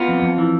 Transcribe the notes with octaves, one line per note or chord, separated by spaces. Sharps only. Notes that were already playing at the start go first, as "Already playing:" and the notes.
Already playing: B3 F4
F2
F2
E3